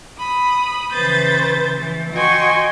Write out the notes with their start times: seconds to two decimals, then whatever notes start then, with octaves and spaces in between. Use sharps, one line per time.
0.18 B5 D#6
0.92 C#3 E3 B4 C5 G6 A6
1.78 E3
2.13 F#4 D#5 G5 G#5 C6 C#6